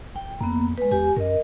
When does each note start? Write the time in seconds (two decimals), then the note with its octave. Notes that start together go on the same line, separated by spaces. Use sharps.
0.16 D1 G5
0.41 F2 A#3 B3
0.78 G#3 B4
0.91 E2 G4 G#5
1.17 F#2 A#4 D#5